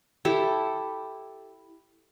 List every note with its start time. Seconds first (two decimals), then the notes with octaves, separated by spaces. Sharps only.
0.25 E4 G4 A4